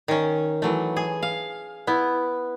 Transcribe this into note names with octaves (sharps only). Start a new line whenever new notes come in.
D#3 C#4
E3 F#3 A3
G#4
F5
B3 E4